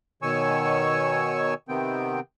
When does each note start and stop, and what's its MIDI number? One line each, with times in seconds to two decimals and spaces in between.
0.22 1.54 47
0.22 1.54 51
0.22 1.54 73
0.22 1.54 80
0.22 1.54 85
0.22 1.54 88
1.69 2.20 48
1.69 2.20 51
1.69 2.20 59
1.69 2.20 60
1.69 2.20 79